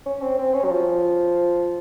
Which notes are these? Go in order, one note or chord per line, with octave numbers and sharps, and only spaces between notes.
C#4
C4
C4
C#4
F#3
F3